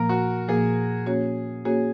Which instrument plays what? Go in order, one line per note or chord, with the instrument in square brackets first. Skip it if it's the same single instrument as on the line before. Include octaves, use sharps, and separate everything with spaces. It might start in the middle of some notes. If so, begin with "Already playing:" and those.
Already playing: [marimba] A#2 F3 A#3 [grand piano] A#4
[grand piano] F#4
[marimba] A#2 F3 A#3 [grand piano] G#4
[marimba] A#3 C#4 F#4 C#5
[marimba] A#3 C#4 F#4 C#5 [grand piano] G#4